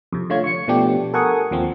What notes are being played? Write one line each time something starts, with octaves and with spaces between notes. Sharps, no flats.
F2 C3
D3 A3 F4 C#5 G#6
C#6 C#7
B2 F3 A3 B3 D4 G4
A4 A#4 F#5 G#5 C#6 D#6
D#2 F3 C4